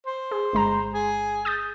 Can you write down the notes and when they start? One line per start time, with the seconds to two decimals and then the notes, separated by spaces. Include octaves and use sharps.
0.06 C5
0.31 G#4
0.53 G1 G#3 A#5
0.94 G#4
1.45 D#6 G6 A6